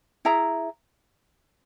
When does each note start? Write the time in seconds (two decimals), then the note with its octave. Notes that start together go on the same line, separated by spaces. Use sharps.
0.25 E4 G#4 E5 A#5